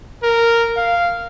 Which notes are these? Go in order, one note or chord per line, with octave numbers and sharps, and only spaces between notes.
A#4
F5